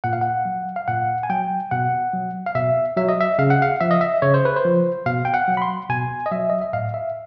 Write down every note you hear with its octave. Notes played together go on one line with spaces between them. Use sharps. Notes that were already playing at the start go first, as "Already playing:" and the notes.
A#2 F#5
F5
F#5
F#3
F5
A#2 F#5
G#5
F#3 G5
B2 F#5
F#3
F5
B2 E5
F#3 E5
D#5
E5
C#3 F5
F#5
F5
F3 E5
D#5
E5
C#3 C#5
C5
B4
C5
F3
B2 F5
G5
F#5
F#3
B5
C6
B2 G#5
D#5
F#3 E5
D#5
E5
A2 F5
E5